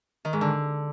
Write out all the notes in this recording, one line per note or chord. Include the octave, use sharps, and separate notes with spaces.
D#3
G#2
D3